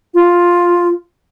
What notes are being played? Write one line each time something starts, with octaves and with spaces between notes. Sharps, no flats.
F4